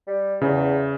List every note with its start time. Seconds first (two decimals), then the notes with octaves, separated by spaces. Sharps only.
0.07 G3
0.41 E2 C#3